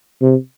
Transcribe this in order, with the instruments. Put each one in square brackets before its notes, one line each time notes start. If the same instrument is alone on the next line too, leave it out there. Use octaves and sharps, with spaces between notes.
[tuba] C3